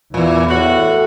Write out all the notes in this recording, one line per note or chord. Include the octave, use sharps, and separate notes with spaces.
E2 A#2 E3
A2 F#4